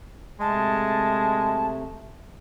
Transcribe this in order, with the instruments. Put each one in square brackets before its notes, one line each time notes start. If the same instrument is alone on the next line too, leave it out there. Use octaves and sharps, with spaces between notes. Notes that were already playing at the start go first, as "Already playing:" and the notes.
[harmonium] C3 A3 [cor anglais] G#3 [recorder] A5